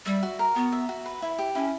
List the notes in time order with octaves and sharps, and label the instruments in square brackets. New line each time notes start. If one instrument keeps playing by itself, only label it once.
[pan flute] G3 [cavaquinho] E5
[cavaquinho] F#4
A#4
[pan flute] B3 [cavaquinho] F#4
[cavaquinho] E5
F#4
B4
E4
G4
[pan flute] C#4 [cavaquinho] E4